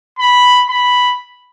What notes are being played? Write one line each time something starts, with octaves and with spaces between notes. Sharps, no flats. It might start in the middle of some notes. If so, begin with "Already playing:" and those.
B5
B5